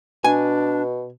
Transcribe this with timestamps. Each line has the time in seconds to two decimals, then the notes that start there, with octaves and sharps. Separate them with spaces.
0.24 B2 D4 G#5